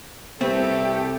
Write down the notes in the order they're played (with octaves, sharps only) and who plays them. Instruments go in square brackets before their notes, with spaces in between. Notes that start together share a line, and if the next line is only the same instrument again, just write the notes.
[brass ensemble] C2 A4 [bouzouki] A3 B4 [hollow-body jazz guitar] C4 [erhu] G4